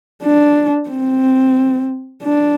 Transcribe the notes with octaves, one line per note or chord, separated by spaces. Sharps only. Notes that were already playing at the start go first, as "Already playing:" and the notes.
D4
C4
D4